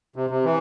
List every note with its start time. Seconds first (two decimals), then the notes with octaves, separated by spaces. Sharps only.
0.16 C3
0.30 C3
0.45 E3